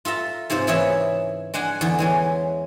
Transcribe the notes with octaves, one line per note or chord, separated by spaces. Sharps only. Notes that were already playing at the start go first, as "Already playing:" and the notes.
F4 A4 E5 A#5
G#2 C3 F4 C5
C#3 E3 E4 G#4 C#5 E5
G#3 D4 F#5 G#5
E2 D3
E3 G#3 C#4